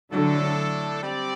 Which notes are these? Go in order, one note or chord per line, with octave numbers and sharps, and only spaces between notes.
A2 D3 F#3 A3 D4 A4
G3 C4 G4 D5